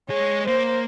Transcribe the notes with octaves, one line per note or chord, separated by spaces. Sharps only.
G#3 G#4 C#5
A#3 C5